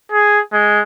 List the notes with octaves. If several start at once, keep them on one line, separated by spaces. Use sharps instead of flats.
G#4
G#3